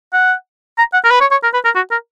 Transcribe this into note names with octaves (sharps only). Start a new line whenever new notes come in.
F#5
A#5
F#5
A#4
B4
C#5
C#5
A#4
B4
A#4
F#4
A#4